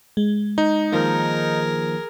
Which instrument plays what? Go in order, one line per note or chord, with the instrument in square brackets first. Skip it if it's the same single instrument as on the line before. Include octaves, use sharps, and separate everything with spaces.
[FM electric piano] G#3
[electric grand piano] D#4
[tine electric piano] D#3 F3 A#3 [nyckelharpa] G#4 A#4